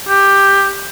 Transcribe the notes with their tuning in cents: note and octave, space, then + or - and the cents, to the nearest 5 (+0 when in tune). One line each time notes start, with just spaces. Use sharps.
G4 +10